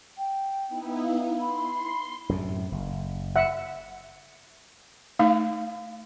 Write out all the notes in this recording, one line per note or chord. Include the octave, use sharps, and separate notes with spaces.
G5
B3 D#4 E4
F5
B5 C6
F#2 A2 C3
F#1
E5 F#5
A3 D#4 F5